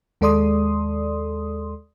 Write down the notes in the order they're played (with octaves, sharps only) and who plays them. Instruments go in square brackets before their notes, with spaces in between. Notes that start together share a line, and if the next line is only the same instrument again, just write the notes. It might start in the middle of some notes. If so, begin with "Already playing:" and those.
[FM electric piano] D#2 G#3 A4 D5 C6 D#6